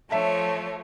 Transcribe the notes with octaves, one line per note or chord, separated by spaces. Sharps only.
F3 A3 C#5 E5 A5